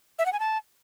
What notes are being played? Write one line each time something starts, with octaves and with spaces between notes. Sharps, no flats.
E5
F#5
G#5
A5